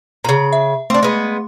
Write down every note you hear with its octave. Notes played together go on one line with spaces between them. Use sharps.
A#2 C#3 A#5
E5
A3 C4 D4 C6
G#3 B3